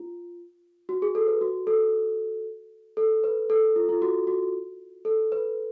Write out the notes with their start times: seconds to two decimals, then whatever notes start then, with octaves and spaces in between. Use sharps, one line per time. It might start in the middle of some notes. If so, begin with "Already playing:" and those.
Already playing: F4
0.89 F#4
1.02 G#4
1.15 A4
1.28 B4
1.41 F#4
1.67 A4
2.97 A4
3.24 B4
3.50 A4
3.76 F4
3.89 F4
4.02 F#4
4.27 F#4
5.05 A4
5.32 B4